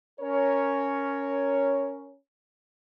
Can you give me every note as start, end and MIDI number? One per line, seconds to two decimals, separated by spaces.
0.21 2.16 61
0.21 2.16 70
0.21 2.16 73